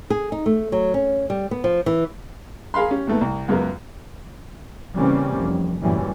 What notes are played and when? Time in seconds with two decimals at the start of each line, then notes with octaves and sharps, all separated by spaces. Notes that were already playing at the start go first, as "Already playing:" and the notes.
0.10 G#4
0.32 D#4
0.46 A3
0.72 F#3
0.94 C#4
1.30 G3
1.51 B3
1.64 F3
1.86 E3
2.74 G#4 A#4 F5 B5 C6
2.91 C#4 G4
3.07 D#2 G#2 A3 B3
3.21 C2
3.48 C#2 F#2 B3 A#4
4.98 C#3 E3 G3 A#3 C4 C#4
5.37 F1
5.82 F#1 F#2 A2 E3 G3 C#4